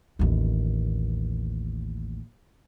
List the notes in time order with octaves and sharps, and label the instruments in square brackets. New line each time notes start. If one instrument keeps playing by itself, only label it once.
[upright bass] A1 D#2